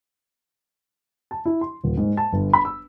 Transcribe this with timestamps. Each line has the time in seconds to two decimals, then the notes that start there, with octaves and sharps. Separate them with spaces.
1.31 A5
1.45 E4
1.61 C6
1.84 D#1
1.97 G#2
2.17 A5
2.32 G1
2.53 B5
2.65 E6